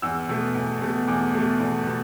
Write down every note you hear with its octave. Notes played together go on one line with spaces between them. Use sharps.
E2 E6
B2 A3
E2
B2 A3
E2 D6
B2 A3
E2
B2